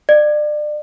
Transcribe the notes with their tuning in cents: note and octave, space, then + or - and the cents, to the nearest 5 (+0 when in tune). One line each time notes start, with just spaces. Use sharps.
D5 +30